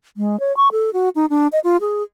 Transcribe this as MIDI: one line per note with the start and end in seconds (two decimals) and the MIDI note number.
0.17 0.39 56
0.40 0.55 73
0.57 0.68 85
0.72 0.90 69
0.93 1.09 66
1.15 1.26 63
1.30 1.47 62
1.53 1.59 75
1.64 1.77 65
1.81 2.03 68